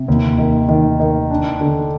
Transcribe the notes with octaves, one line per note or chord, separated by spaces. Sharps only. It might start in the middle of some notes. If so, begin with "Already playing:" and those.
Already playing: C3
D#2
D#3
D#3
D#3
D4
D3